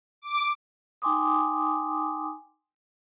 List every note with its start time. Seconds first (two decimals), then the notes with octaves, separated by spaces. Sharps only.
0.22 D6
1.02 D#4 G5 G#5 C6 D6 D#6